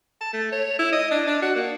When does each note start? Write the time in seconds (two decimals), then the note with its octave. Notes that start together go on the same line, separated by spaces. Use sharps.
0.21 A5
0.33 A3
0.52 C#5
0.79 E4
0.92 D#5
1.11 D4
1.27 D4
1.42 F#4
1.55 A#3